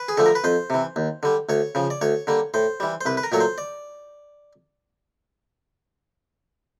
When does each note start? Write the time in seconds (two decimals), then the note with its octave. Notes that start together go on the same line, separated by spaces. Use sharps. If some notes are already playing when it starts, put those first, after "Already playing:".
Already playing: B4
0.08 G#4
0.17 D3 F3 A3 A4
0.26 A#4
0.35 B4
0.44 F2 C5
0.70 C3 E3
0.96 D#2
1.23 D3 G3
1.49 D2 C#5
1.75 C#3 F3
1.90 D5
2.01 D2 C#5
2.27 D3 G3 A#3
2.54 A2 C5
2.80 E3 G3
3.01 C5
3.06 C2 B4
3.17 B4
3.23 A#4
3.32 A#2 F#3 A3 C#5
3.40 C5
3.58 D5